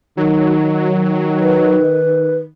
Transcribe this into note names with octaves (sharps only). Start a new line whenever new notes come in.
D#3 F#3
B4